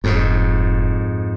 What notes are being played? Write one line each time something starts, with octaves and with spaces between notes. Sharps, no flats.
F1 F2 G#2